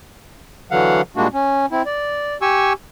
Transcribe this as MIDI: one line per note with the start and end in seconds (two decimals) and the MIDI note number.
0.71 1.01 50
0.71 1.01 52
0.71 1.01 54
0.71 1.01 77
0.71 1.01 78
1.16 1.27 46
1.16 1.27 55
1.16 1.27 56
1.16 1.27 58
1.16 1.27 62
1.16 1.27 66
1.34 1.66 61
1.72 1.82 60
1.72 1.82 64
1.86 2.37 74
2.42 2.73 67
2.42 2.73 80
2.42 2.73 85
2.42 2.73 88